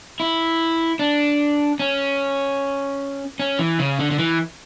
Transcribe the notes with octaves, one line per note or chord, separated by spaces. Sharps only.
E4
D4
C#4
C#4
E3
C#3
D3
D3
E3